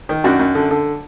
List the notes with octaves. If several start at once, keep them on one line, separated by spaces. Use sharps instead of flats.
D#3
F#2 D4 F#4
F#2
D3
D3